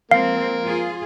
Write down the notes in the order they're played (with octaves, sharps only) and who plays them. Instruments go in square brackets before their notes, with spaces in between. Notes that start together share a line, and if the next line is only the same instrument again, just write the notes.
[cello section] F3 G#3 C4 [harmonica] A#3 [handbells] F5
[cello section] F4 G#4